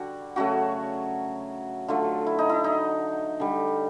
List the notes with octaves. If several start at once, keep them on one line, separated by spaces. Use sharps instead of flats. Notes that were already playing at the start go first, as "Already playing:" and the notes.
Already playing: D3 G3 F#4
C#3 F#3 A3 F#4
D3 F#3 A3 F4
E4
D#4
E4
D#4
D3 G3